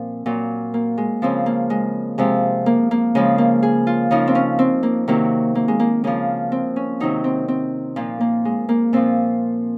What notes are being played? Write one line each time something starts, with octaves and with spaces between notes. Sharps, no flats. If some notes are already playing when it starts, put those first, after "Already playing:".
Already playing: A#2 F3 C4
A#2 F#3
A#3
G#3
C#3 F3 C4
A#3
G#3
C3 F3 G#3
A#3
A#3
C#3 F3 G#3
A#3
G#4
F4
C#3 F3 D#4
C4
C#4
C4
A#3
C3 D#3 F#3 A#3
A#3
G#3
A#3
C#3 F3 A#3
C4
C#4
C3 D#3 F#3 D#4
C4
C4
A#2 F3 A#3
A#3
G#3
A#3
A#2 F3 C4